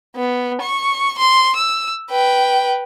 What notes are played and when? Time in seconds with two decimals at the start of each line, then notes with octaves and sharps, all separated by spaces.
0.17 B3
0.62 C#6
1.19 C6
1.56 E6
2.10 B4 G5